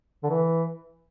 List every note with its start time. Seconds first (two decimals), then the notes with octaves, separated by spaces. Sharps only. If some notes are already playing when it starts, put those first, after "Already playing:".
0.23 D3
0.30 E3